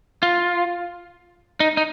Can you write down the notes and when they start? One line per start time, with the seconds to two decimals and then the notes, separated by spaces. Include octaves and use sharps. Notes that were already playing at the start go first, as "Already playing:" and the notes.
0.23 F4
1.60 D#4
1.77 D#4